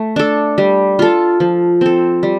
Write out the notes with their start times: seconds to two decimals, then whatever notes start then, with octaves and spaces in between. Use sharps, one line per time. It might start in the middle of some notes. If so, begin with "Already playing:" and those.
Already playing: A3
0.16 D4 A4
0.58 G3
0.99 F4 A4
1.40 F3
1.81 C4 A4
2.23 G3